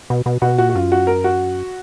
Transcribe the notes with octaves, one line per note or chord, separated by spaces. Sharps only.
B2
B2
B2 F#4
A#2 F#4
F#4
F#2 F4
F#4
A#4
F#4